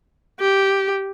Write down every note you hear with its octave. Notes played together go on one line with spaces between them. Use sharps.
G4